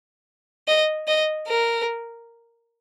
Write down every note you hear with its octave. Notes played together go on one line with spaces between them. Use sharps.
D#5
D#5
A#4